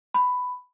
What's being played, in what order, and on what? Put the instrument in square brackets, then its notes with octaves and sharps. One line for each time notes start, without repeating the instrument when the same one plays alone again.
[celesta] B5